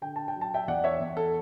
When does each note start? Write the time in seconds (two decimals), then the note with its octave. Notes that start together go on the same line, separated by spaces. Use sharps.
0.01 D3 G5
0.16 A5
0.28 G5
0.35 F#3
0.41 A5
0.54 E5 G5
0.68 E2 D5 F#5
0.84 C#5 E5
1.00 E2
1.17 A4